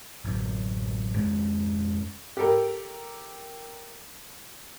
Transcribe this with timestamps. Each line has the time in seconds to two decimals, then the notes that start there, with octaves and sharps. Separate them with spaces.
0.25 A1 F#2
1.15 F2 G#3 C#4
2.37 G4 A4 A#4